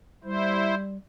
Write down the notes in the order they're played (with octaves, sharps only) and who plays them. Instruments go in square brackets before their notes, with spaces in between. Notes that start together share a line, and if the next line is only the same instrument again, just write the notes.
[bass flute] G3 [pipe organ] E4 C5